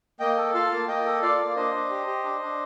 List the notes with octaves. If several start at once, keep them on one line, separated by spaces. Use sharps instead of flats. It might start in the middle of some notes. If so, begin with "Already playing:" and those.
A#3 D#5 G5
A4
F4 F5 A5
A#3
A#3 D#5 G5
A4
F4 D5 F5
A#3
D4 C5 D#5
D4
G4
G4
D4
D4